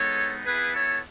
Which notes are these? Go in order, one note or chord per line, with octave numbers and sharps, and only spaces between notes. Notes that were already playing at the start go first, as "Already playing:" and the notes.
Already playing: G#3 B3 D#4 A4 C#5
B3 E4 G#4 B4
A4 C#5